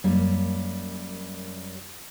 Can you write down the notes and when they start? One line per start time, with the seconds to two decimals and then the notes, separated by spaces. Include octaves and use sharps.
0.04 F#2 G3 A#3